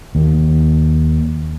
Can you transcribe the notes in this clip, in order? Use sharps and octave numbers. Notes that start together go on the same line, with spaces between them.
D#2